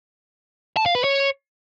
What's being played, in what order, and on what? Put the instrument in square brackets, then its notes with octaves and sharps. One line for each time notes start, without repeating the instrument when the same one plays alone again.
[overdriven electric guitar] A5
F5
B4
C#5